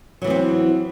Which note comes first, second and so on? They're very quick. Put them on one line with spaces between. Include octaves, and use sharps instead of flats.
F#3 E3 B3 C4